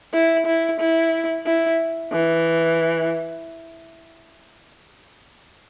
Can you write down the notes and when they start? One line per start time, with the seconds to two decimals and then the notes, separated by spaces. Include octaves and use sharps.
0.14 E4
0.46 E4
0.80 E4
1.46 E4
2.13 E3